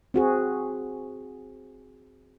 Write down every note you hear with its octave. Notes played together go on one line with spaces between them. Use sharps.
C4 F#4 G#4